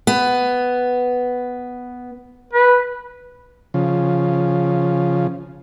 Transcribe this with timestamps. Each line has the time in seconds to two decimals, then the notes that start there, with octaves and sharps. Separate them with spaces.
0.07 B3
2.53 B4
3.74 C#3 F3